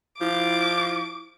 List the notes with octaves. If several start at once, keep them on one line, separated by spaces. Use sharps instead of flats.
F3 E4 D6